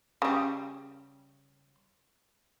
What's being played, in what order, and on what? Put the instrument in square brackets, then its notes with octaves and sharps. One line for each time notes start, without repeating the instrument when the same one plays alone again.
[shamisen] C#3 G3